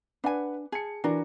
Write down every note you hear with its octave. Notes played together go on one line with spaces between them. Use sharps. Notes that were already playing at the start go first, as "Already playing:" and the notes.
D4 B4 F#5 G#5
G#4 A5 C#7
E3 D4 F#4 A#4